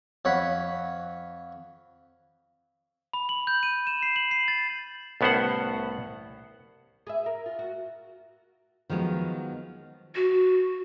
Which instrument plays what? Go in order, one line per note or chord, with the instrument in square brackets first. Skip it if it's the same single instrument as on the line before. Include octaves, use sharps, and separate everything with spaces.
[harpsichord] F2 C#5 F#5 B5
[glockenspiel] B5
F#7
G6
D#7
E7
C7
F#7
C7
A6
[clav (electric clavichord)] C2 A2 B3 C#4 C5 F#5
[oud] G#4 B4 E5
A#4
F4
F#4
[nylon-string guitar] D#3 F3 F#3 G#3 B3
[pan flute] F#4